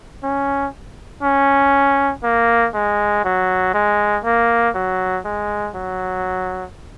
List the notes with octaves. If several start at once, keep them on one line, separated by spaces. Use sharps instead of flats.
C#4
C#4
A#3
G#3
F#3
G#3
A#3
F#3
G#3
F#3